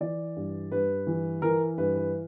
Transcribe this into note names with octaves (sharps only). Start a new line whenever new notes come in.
E3 D5
G2
G2 B4
E3
E3 A#4
G2 B4
B4